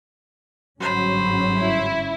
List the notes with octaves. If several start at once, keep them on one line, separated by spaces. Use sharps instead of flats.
G1 G#2 F#3 C#4 C5 B5
E4